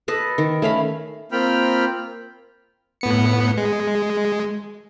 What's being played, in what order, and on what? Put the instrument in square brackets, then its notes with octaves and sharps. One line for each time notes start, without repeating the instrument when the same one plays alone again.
[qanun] A4 B4 D#5
D#3
A3 C#4 F5 B5
[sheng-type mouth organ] A#3 C4 F4 G5 B5 F6
[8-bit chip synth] A2 B3 C#7
G#3